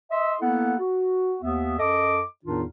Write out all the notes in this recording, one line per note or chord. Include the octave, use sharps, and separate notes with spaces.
D#5 E5 C6
A#3 B3 E4 A4 F#5
F#4
D#2 B3 E5
F#2 A4 D#5 D6
E2 A2 D#3 D4 D#4 F4